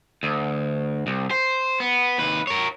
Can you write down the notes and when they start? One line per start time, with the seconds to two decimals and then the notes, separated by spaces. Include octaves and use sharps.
0.23 D2
1.07 C2
1.31 C5
1.80 B3
2.18 D#2 B4
2.47 A#4 C#5